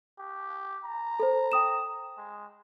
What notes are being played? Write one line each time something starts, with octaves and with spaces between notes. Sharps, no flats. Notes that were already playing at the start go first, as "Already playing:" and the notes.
G4
A#5
A4 C5
G5 D#6 E7
G#3